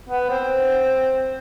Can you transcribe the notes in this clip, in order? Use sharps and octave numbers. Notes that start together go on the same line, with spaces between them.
B3
C4